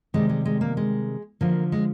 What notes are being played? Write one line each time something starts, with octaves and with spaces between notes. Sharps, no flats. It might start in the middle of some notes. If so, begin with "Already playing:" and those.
C3 D#3 G3 G#3
G#3
G#3
A#3
G#3
D3 F3 A#3
G#3